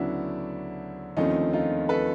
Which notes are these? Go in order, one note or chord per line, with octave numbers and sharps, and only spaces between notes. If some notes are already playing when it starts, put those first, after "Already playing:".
Already playing: D2 C#3 F#3 B3 D4 E4
D#2 D3 F3 A3 C4 C#4 D#4
D#4 F4
A4 B4